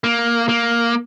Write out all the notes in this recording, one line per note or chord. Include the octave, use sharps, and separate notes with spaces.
A#3
A#3